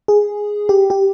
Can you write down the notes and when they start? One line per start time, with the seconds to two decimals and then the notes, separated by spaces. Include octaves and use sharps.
0.08 G#4
0.69 G4
0.90 G4